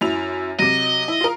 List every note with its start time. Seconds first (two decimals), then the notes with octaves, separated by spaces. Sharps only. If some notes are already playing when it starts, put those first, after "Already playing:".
0.01 F#2 E4 F7
0.59 C3 F#3 D#5
1.08 E4
1.21 F4 A#4